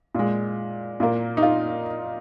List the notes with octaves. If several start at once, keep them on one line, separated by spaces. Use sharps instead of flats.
A#2 G#3
A#2 A#3
D#4
F4